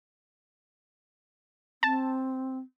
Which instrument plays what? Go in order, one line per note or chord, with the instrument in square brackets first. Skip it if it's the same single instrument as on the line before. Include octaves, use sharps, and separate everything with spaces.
[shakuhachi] C4 [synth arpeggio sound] A5